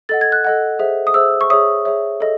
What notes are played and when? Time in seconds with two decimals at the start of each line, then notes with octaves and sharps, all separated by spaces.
0.09 A4 D#5 F#5 A6
0.21 G#6
0.32 F#6
0.44 A4 D#5 F#5
0.79 G#4 C5 E5
1.07 D#6
1.14 G#4 C5 E5 E6
1.41 C#6
1.50 G#4 C#5 E5 D#6
1.85 G#4 C#5 E5
2.20 A4 D#5